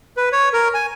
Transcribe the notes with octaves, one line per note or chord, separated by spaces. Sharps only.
B4
C#5
A#4
G#5